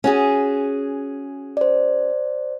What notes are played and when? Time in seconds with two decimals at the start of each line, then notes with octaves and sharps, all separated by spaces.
0.04 C#4 F#4 G#4
1.57 C5 D5